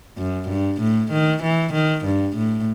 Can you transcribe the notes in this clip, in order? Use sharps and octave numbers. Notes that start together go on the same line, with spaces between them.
F#2
G2
A2
D#3
E3
D#3
G2
A2